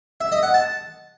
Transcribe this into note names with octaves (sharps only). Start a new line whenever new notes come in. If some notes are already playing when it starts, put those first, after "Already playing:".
E5
D#5
F#5
A5